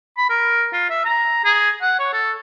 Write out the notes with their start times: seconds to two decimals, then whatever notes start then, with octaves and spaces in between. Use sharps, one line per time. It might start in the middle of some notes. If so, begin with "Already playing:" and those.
0.17 B5
0.30 A#4
0.73 F4
0.90 E5
1.05 A#5
1.45 G#4
1.82 F#5
1.99 C#5
2.13 A4